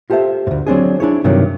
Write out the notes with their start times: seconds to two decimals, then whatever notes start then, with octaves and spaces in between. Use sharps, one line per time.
0.10 F4 G4 A4 C5 E5
0.47 D2 G#2
0.67 F#3 C4 D4 G#4
1.00 D4 E4 G#4 C#5
1.24 G2 C3 D#3 F#3